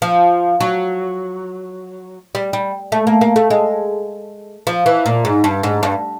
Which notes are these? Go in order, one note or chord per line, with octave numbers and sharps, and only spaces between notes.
F3
F#3
G3
G3
A3
A#3
A#3
A3
G#3
F3
E3
A#2
G#2
G2
G#2
G2